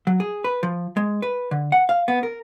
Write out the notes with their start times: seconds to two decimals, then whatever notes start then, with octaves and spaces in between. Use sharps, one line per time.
0.07 F#3
0.20 G#4
0.44 B4
0.63 F3
0.97 G#3
1.22 B4
1.51 D3
1.72 F#5
1.89 F5
2.08 B3
2.23 A#4